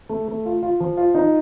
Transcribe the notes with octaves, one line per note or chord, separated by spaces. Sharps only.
A3
A3
F4
F4
F3
F4
D#4